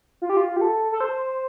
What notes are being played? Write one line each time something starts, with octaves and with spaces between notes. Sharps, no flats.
F4
G4
F4
G4
A4
A4
C5